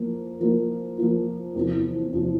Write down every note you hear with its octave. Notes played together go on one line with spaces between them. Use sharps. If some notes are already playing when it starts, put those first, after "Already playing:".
Already playing: F3 A#3 F4
F3 A#3 F4
F3 A#3 F4
E2 C3 F3
E2 C3 F3